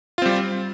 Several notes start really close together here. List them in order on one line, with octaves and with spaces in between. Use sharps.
F4 C4 G3